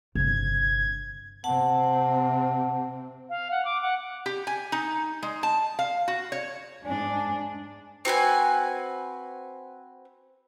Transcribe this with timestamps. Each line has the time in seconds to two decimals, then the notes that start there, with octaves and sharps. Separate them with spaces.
0.15 G1 C3 G#6
1.44 C3 C4 F#5 A5
3.29 F5
3.51 F#5
3.65 D6
3.82 F#5
4.26 G4
4.47 G#5
4.72 D#4
5.23 G#3
5.43 A5
5.79 F5
6.08 F#4
6.32 C#5
6.85 G#2 D4 G#5
8.05 C4 F#4 B4 G#5